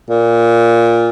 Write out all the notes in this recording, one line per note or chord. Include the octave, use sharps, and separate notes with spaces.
A#2